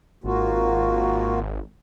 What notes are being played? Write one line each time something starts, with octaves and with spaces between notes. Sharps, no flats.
G#1 A#3 F4 F#4